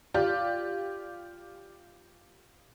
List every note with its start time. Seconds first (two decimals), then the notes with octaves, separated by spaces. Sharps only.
0.14 F4 G4 D5